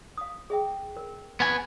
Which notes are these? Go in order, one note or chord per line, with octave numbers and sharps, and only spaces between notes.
F5 D#6
G#4 E5 G5
A#4
B3 G#5